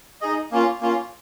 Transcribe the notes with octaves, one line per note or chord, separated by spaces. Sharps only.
D#4 G#4 D#5
A#3 C#4 F4
A#3 C#4 F4